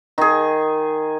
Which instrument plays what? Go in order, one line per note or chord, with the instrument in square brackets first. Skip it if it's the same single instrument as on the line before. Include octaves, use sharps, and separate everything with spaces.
[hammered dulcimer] D#3 G#4